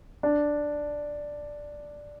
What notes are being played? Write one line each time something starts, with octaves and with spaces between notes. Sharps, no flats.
D4